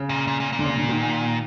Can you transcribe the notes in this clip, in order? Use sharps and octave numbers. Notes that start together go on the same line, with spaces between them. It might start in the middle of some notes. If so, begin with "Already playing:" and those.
Already playing: C#3
A#2
A#2
A#2
A#2
D3
C#3
D3
D#3